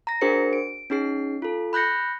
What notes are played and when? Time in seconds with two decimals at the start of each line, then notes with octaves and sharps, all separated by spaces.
0.07 A#5 A#6
0.21 D4 F#4 G#4 A#4 C5 C#7
0.53 D7
0.90 C#4 D#4 G#4 C7
1.42 F4 A4
1.73 B5 F#6 G6 A#6 C#7